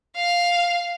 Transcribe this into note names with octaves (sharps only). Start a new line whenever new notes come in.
F5